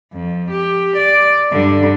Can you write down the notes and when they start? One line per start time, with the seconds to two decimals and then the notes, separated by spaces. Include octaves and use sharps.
0.13 F2
0.51 G4
0.97 D5
1.52 G2 D3